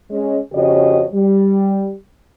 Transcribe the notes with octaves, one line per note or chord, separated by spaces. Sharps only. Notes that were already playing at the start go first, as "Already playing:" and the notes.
G#3 C#4
F2 C#3 F#4 G4 C#5 D#5
G3